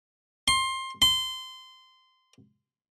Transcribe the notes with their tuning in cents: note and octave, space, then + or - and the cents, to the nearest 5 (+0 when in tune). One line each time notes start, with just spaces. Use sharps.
C6 +20
C6 -20